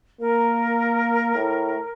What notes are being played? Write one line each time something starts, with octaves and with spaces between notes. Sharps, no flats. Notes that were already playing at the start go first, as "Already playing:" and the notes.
A#3 A#4
A2